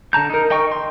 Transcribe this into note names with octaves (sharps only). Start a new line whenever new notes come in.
D3 A5 A#5 G6
D#4 A#4
D#4 D#5 G5 C#6
C6